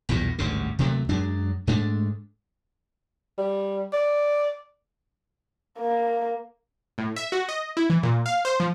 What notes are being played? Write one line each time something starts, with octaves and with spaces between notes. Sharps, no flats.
B1 E2 G2 A#2
G#1 D2 G2 C#3
D#2 C3 F#3 A3
F#2 F#3 G#3 D4
G#2 G#3 A3 D4
G3
D5
A#3
A2
E5
F#4
D#5
E4
E3
A#2
F5
C5
F3